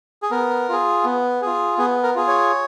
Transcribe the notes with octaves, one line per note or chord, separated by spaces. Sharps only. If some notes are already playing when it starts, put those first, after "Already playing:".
G#4
B3 A#4
F4 G#4
B3
F4 G#4
B3 G#4
A#4
F4 G#4
C#5